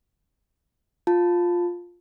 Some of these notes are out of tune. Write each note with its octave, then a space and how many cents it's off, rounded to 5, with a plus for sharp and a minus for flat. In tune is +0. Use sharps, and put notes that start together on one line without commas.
F4 +5 A5 +5